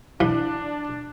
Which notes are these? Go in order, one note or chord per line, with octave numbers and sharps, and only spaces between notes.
E3 D4